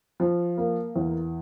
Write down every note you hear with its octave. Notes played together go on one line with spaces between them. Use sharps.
F3
A#3
E2